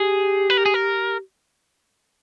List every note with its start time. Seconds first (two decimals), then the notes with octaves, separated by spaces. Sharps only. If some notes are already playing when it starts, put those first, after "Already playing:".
Already playing: G4 G#4
0.50 B4
0.57 A#4
0.66 G#4
0.74 A#4